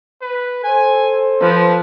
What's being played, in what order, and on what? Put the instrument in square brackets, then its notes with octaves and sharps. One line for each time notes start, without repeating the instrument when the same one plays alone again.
[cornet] B4
[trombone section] A4 C5 [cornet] G#5
[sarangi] F3 [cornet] B4